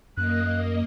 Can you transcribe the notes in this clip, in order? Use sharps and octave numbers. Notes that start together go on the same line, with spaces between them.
F#2 A#3 D#5 F#6